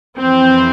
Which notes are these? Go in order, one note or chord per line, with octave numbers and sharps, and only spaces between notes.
F2 E3 C4